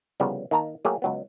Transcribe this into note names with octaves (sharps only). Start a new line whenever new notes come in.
C2 C#3 F3 G3 B3
D#3 A#3 A5 A#5
F#3 A3 A#3 G4 G#4
C#2 F#3 B3